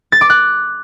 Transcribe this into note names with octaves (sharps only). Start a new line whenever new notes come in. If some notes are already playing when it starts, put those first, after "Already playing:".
A6
D6
F#6